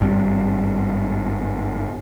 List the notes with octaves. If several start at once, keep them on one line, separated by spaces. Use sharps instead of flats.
G#1 G2 G3 C4